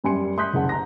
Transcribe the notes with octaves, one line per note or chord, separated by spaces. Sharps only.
F#2 G3 G#5 C6 C#7
C6 D#6 F#6 G6 B6
F#1 G#4 F#5 A5
A#5 A#6